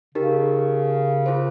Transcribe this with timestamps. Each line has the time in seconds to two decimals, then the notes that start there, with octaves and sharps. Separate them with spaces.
0.15 C#3 D#4 G4 A#4
1.26 F4 G#4 C5